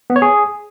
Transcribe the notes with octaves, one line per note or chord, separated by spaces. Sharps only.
B3
C#5
G#4